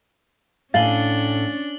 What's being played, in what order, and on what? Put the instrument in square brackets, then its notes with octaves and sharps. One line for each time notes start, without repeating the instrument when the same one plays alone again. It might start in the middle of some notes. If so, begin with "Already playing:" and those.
[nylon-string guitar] A2 G#5 [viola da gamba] C#4 D4 [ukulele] F5 [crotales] A6 F#7 G7